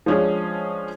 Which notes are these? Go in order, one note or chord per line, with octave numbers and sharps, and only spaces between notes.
F3 G#3 C#4 D4 G#4